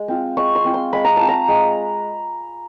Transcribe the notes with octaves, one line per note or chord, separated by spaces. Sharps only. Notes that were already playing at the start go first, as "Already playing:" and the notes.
Already playing: G#3
C4 F4
G#3 C#6
C6
C4 F4
C6
G#3 B5
A#5
C4 F4 A5
A#5
G#3